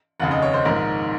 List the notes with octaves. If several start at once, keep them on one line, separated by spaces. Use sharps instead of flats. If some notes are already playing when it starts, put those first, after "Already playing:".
F1 D#2 C#3 F#5
D#5
C#5
C5
A#1 G#2 D#3 A#4